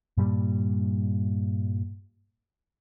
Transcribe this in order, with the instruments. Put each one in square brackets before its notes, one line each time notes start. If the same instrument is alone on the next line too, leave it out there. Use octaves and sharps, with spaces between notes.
[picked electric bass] G2 A#2 G3